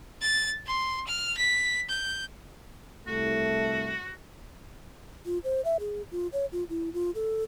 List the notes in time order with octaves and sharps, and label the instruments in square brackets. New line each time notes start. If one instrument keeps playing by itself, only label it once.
[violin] A6
C6
F6
B6
G6
[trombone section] C2 A3 [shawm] F#4
[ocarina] F4
C5
E5
G#4
F4
C#5
F4
E4
F4
A4